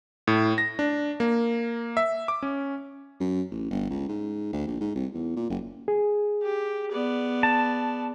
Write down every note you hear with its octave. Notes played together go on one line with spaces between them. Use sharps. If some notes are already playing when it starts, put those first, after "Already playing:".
A2
A#6
D4
A#3
E5
D6
C#4
F#2
A1
G1
C#2
G#2
D2
A#1
G#2
C2
E2
A#2
F#1
G#4
G4
B3 D5
A5